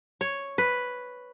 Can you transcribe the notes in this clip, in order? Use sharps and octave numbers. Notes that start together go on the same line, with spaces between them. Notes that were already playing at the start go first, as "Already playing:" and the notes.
C#5
B4